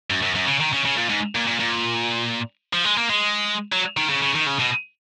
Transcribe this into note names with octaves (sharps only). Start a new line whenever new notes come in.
F#2
F#2
F#2
C#3
D#3
C#3
C#3
A#2
G#2
A#2
A#2
A#2
F3
G#3
A#3
G#3
F#3
D#3
C#3
C#3
D#3
C#3
B2